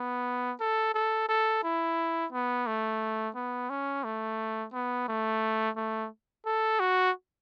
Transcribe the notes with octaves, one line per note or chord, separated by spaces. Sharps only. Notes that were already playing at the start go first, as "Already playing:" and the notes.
Already playing: B3
A4
A4
A4
E4
B3
A3
B3
C#4
A3
B3
A3
A3
A4
F#4